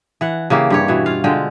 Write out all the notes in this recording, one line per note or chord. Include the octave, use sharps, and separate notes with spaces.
E3 F#5
C#3 E3 A#3 G4
G2 G4 C#5
B2 E3
F4 F5
D3 G#3 F4 G5